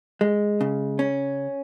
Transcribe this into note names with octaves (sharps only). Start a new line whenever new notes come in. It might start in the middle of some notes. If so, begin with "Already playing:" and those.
G#3
C#3
C#4